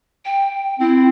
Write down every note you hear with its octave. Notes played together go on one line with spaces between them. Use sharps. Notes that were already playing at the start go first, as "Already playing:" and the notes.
G5
C4 E4